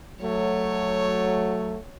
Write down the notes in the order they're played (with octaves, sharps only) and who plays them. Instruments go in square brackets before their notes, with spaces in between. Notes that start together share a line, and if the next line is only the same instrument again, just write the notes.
[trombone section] F#3 A3 [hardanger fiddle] C#5